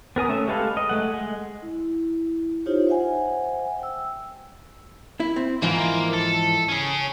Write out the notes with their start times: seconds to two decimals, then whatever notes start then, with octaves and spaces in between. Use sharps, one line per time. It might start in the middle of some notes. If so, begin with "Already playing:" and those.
0.16 B3 A#4 G#5 D#6
0.28 A3 C#4 E5
0.48 G#3 G4 A4 B4 F5
0.77 D#5
0.89 G#3 A3 F#5
1.14 G#3
1.62 E4
2.66 D#4 F4 G4 C5 C#5
2.87 C5 E5 F#5 G#5
3.79 G5 E6
5.20 E4
5.36 C4
5.62 G#2 E3 F3 A#3
6.13 A4
6.68 C#4 G#4